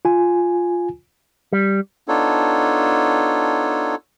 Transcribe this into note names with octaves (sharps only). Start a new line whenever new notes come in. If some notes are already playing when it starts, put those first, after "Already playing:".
F4 G#5
G3
B3 D4 D#4 F4 A4 C#5